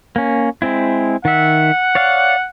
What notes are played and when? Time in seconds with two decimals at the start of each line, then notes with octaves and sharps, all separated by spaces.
0.16 A#3 C#4
0.62 G#3 C4 E4
1.25 D#3 E5 F#5
1.95 C#5 D5 F5